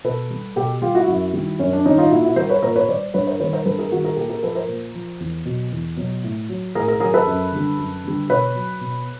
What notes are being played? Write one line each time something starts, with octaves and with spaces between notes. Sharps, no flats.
B2 A4 B4
G3
B2 G4 A4
G3 F4 G4
E4 F#4
F#2 E4 F#4
D#3 G3
F#2 C#4
D4
D#3 G3 C#4 D#4
D#4 F4
A#2 E4 F#4
E4 F#4
G3 A#4 C5
B4 C#5
A#2 A#4 C5
B4 C#5
G3 C5 D5
G2 B4 C#5
A#4 C5
D#3 G3 B4 C#5
A#4 C5
G2 A4 B4
G#4 A#4
D#3 G3 F#4 G#4
G#4 A#4
A#2 G4 A4
G#4 A#4
F3 A4 B4
A#4 C5
A#2
F3
E2
B2 F#3
E2
B2 F#3
A2
F#3
A2 G#4 A#4
G#4 A#4
F#3 G#4 A#4
A4 B4
F#2
D3 G3
F#2
D3 G3
B2 B4 C#5
F#3
B2